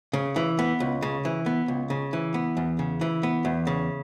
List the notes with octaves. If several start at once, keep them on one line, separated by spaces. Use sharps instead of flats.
C#3
E3
B3
C#2
C#3
E3
B3
C#2
C#3
E3
B3
E2
C#3
E3
B3
E2
C#3